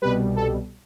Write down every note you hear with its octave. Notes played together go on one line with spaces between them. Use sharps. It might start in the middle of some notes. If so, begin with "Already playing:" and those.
C2 B2 G3 B4
A4